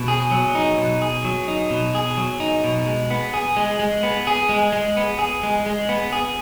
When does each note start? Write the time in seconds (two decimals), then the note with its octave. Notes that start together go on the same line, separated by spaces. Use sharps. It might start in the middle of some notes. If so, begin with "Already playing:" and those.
Already playing: B2
0.08 G#4
0.31 F#3
0.55 D#4
0.78 B2
1.02 G#4
1.25 F#3
1.48 D#4
1.71 B2
1.95 G#4
2.17 F#3
2.40 D#4
2.64 B2
2.87 G#3
3.11 B3
3.34 G#4
3.57 G#3
3.79 G#3
4.03 B3
4.27 G#4
4.49 G#3
4.73 G#3
4.97 B3
5.19 G#4
5.43 G#3
5.66 G#3
5.89 B3
6.12 G#4